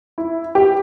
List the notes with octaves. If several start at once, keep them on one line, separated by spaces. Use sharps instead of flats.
E4
G4